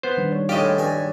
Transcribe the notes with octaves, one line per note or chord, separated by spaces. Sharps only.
B3 C5
D#3 G3 D4
C#5
A2 A3 D4 F4 G4 G#4 C#5 D#5
G2 D#3 G#5